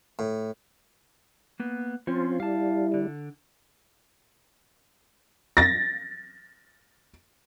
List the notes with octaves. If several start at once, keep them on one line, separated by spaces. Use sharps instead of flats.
A2
A#3 B3
F3 C4 C#4 F4
G3 E4 F5 A5
D3
A6 A#6